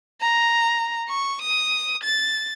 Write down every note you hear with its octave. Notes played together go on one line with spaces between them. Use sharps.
A#5
C#6
D#6
A6